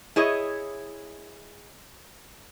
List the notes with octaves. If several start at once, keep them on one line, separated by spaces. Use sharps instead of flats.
E4 G#4 C#5 D#5